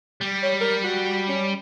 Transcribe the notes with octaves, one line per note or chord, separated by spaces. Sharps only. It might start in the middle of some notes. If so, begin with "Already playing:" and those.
G3
C#5
A#4
F#4
C#4